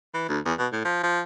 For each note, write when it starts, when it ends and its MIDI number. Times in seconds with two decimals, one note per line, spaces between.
0.14 0.25 52
0.29 0.39 38
0.45 0.53 40
0.59 0.67 47
0.72 0.85 45
0.85 1.02 53
1.03 1.21 53